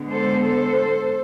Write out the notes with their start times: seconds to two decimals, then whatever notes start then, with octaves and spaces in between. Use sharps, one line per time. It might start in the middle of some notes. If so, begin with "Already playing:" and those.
Already playing: D3 G#3 B3
0.12 A4 C5
0.45 A4 C5